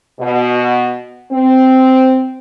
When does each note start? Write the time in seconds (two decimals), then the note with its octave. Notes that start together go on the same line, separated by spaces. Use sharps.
0.20 B2
1.31 C4